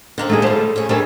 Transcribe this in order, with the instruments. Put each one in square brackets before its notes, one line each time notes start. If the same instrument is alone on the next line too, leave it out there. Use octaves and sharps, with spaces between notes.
[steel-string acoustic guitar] D3 A#3 C4
[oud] A3 D#4 G#4
[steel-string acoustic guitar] F3 G3 [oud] A3 C5
[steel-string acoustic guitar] C#3 A3 G#4
[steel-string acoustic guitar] G3 A3 A#4 [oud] C4 D4 G#4